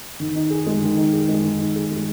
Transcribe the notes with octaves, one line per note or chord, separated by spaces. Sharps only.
D#3
D#4
G#4
G#3
D#3
D#4
G#4
G#3
D#3
D#4
G#4
G#3